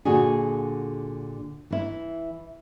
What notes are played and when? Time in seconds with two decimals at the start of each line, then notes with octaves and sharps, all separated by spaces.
0.05 A#2 D3 D4 F#4 G#4
1.71 E3 E4